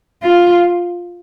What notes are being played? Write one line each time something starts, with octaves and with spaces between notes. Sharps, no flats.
F4